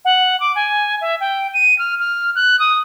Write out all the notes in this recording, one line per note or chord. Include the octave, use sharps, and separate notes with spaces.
F#5
D6
G#5
E5
G5
D#7
F6
F6
F#6
D#6